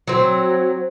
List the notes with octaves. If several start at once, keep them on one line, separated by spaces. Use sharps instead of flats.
F#3 C4